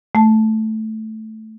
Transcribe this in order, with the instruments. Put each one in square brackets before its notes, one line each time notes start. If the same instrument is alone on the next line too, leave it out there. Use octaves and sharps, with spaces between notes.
[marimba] A3 A5